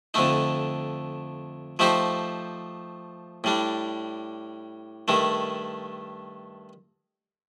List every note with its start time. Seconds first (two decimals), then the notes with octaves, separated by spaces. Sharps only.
0.14 F2 D3 A3 D#4
1.79 F3 A3 D#4 G4 C5
3.44 A2 G3 D4
5.08 G2 D#3 A3